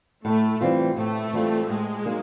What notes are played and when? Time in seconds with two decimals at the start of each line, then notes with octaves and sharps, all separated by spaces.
0.25 A2 A3
0.61 E3 G3 C4 F4
0.97 A2 A3
1.33 E3 G3 C4 F4
1.69 A2 G#3
2.06 F#3 A#3 D#4 G#4